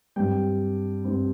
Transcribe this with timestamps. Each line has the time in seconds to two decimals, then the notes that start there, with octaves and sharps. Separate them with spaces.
0.16 G2 G3 C4 G5
1.04 G2 G3 C4